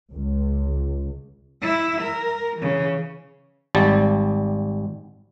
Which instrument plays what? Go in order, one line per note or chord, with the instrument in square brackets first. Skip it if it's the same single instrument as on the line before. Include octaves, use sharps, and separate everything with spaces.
[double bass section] C#2
[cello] E4 E5
A#4
C#3 E3
[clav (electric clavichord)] G#1 G3 A5